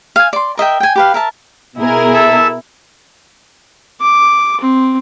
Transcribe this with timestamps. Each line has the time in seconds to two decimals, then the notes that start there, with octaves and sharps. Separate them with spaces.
0.16 F5 G#5
0.33 D5 C6
0.57 A#4 D#5 E5 G5
0.80 G5 G#5
0.96 G4 B4 F5
1.14 A#4 E5 A5
1.79 B2 E4 G#4 A#4
2.14 A4 E5 E6
4.01 D6
4.61 C4